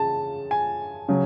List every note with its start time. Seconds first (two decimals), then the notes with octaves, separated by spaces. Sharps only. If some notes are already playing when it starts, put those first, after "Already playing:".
Already playing: C#3 A5
0.51 G#5
1.09 C#3 F#3